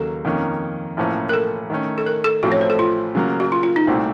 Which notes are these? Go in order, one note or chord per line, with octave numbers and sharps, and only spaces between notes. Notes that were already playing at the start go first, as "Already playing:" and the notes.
Already playing: D#2 C#3 F#3 A#3 A4
F2 D#3 A#3 C#4
A1 A2 F3 A#3 C#4
A#4
A4
D#3 A3 C#4
A4
A#4
A4
A1 A2 F3 A3 C4 F#4
C#5
C5
A4
F4
C#3 F#3 A#3 F4
F#4
F4
F4
D#4
C2 A#2 A3 C4 F#4